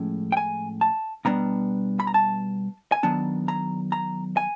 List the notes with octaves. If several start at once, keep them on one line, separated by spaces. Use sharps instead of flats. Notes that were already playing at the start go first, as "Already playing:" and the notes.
Already playing: A2 F3 G#3 C#4
G5
G#5
A5
B2 G3 B3 D4 A#5
B5
A#5
A5
G#5
D#3 F#3 B3 D4 A5
A#5
A#5
G#5